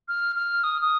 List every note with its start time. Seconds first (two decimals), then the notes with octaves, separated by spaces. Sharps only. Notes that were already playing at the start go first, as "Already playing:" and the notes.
0.08 F6
0.36 F6
0.64 D#6
0.82 D#6